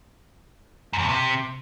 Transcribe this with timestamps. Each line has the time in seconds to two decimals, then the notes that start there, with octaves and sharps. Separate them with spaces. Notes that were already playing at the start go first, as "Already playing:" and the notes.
0.93 F#2
0.98 E2
1.04 B2
1.09 C3